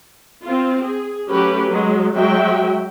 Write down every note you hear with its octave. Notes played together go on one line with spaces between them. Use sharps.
C4 F4
G#4
F#3 A3 C#4 G4 B4
F#3 G#3
F#3 G#3 F#4 E5 G5